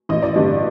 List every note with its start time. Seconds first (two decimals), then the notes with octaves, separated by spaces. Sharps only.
0.09 A1 D#5
0.22 D5
0.34 G2 D3 D#5